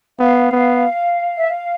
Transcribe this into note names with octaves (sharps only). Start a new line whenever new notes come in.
B3 F5
B3
E5
F5